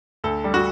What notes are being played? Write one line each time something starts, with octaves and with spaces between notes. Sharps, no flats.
D2 A4
G3
F#4